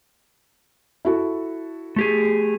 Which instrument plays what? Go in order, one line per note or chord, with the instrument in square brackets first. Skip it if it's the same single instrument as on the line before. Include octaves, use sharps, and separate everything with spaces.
[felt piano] E4 F#4 A4
[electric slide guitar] A3 G4 G#4